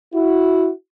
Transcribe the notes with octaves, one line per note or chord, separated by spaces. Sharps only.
E4 F#4